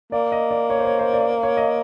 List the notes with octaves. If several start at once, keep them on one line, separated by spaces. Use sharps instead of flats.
A#3 D5
D#5
D5
C#5
C5
C#5
C5
D5
C#5
D#5